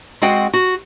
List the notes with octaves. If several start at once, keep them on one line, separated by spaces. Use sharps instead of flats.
G#3 C4 F#4 F#5 G5
F#4